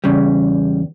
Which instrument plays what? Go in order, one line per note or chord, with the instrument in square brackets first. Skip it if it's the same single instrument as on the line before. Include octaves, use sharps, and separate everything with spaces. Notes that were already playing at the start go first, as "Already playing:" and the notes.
[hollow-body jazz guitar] E2 C#3 G3